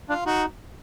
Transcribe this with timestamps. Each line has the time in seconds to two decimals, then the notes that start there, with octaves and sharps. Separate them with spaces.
0.09 D4 F4
0.26 D#4 F#4